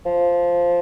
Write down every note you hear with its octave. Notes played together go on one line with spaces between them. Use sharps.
F3